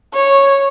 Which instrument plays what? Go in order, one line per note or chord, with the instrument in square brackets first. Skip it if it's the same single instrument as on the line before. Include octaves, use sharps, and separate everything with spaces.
[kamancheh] C#5